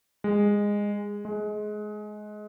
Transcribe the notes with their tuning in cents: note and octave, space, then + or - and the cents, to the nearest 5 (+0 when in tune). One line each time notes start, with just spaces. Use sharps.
G#3 -15
G#3 +20